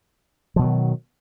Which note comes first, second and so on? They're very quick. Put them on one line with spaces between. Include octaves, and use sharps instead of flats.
F3 B2 F#3 D#3